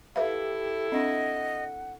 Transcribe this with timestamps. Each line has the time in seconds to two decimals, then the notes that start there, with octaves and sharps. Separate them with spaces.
0.16 E4 G4 A4 B4 E5 F5
0.92 C4 D4 D#5 F#5